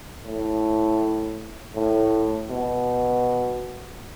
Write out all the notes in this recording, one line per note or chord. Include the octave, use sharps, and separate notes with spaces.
A2
A2
B2